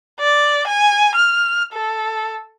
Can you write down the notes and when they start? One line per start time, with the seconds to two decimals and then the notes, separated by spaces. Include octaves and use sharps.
0.20 D5
0.67 G#5
1.15 F6
1.73 A4